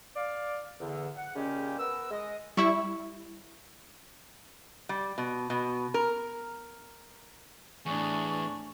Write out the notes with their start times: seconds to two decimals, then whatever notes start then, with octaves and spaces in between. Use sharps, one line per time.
0.16 D5 F5
0.80 E2 D3
1.17 F#5
1.36 A#2 C#3 G#3 C#4 G4 G5
1.79 B3 A#4 B4 E6
2.11 G#3 D#5
2.57 G3 E4 C#6
4.89 G3
5.18 B2
5.50 B2
5.94 A#4
7.86 E2 A2 D4 G#4 C#6